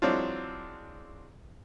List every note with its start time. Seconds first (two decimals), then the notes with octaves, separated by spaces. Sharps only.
0.02 E3 F#3 G#3 C4 D4 F4